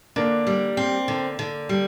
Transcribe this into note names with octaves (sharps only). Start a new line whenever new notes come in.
D3 A#3 D4
G3
C4
D3
D3
G3